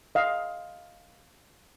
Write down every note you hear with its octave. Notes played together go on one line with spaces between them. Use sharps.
D#5 F5